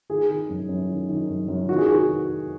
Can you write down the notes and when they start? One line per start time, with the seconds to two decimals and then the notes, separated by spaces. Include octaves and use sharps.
0.09 D#3 G#4
0.29 D#3
0.49 F#2
0.69 F#2
0.90 D#3
1.09 D#3
1.29 F#2
1.48 F#2
1.69 D#3 F#4
1.78 G#4
1.87 D#3 F#4